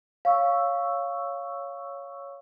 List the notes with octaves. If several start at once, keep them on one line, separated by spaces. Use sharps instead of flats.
C#5 F5 C#6 E6